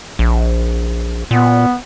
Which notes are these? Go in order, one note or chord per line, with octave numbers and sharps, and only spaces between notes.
A#1
A#2 B3